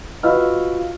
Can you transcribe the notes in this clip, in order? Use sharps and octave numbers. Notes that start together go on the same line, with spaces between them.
F4 F#4 B4 D#5 E6 F6